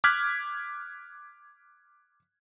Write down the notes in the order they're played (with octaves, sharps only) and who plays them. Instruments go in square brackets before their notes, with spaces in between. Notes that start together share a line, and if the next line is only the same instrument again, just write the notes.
[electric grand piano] D6 F6 F#6 G#6 B6